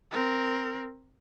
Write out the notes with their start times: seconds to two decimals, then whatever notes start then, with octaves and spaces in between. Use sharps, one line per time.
0.12 C4 A#4